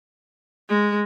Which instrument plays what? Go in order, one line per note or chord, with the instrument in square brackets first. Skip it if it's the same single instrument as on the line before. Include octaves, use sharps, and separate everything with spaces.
[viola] G#3